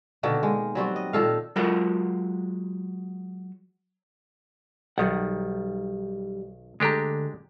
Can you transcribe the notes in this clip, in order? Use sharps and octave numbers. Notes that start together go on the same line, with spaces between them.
B2 D3 D#3 A#3
G#3
F#3 G3 C4 F#4
D#5
A#2 D#3 A4 F5
F#3 G#3 F4 F#4 A#4 F5
B1 D#3 F#3 G3 F#5
D2 G#3 D4 G4 A4 A#5